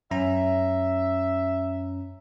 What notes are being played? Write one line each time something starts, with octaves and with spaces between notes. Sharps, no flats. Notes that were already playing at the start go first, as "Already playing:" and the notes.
F#2 C#4 E5 A#5